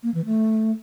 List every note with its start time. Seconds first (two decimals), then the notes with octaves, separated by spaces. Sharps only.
0.03 A#3
0.14 E3
0.26 A3